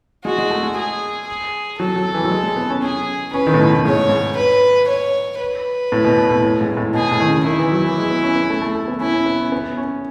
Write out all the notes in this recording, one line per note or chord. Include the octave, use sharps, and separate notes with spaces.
G#3 F#4
G#3
A3
G#3
G#4
G#4
F#3 A4
F#3
E3
F#3
G#3
G#3
B3
C#4
C#4 G#4
C#4 B4
D#3
A2
B2
A2
G#2 C#5
G#2
B4
C#5
B4
A2
B2
B2
A2
A2
G#2
G#2
A2
B2 G#4
A2
D#3
C#3
D#3 E4
E3
F#3
E3
G#3
B3
C#4
B3
A3
A3
A3
B3
C#4 E4
C#4
B3
C#4
B3
C#4